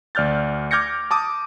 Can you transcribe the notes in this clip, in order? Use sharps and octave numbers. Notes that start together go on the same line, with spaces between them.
D2 D5 F6 G6 A6
D6 F6 G6 G#6 A#6 C#7
A5 D6 D#6